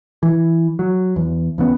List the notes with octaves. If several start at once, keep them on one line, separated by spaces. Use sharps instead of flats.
E3
F#3
E2
E2 C#3 B3